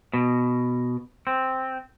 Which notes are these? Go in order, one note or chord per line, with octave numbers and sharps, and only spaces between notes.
B2
C4